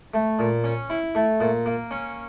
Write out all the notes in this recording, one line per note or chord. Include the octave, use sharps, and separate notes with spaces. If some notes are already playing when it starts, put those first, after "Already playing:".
A3
A#2
C#4
E4
A3
A#2
A#3
C#4